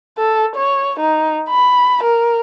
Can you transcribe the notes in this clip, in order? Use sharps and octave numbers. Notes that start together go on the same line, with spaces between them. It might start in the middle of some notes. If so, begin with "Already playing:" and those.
A4
C#5
D#4
B5
A#4